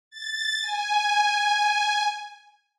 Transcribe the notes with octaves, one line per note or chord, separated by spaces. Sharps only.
A6
G#5